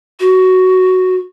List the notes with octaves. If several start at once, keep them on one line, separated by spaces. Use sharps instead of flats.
F#4